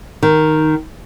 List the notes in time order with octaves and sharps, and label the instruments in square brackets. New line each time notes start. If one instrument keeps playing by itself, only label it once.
[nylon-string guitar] D#3